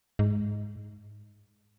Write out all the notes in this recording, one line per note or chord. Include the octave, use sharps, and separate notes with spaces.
G#2